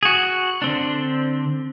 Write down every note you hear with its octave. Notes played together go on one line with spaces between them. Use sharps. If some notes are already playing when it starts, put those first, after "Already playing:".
F#4 G#4
D3 C4 D4